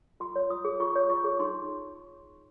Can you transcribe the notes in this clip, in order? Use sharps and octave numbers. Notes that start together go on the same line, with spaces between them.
F4 C6
C#5
F4 D#6
G#4
F4 C#6
C#5
F4 C#6
G#4
D#4 C6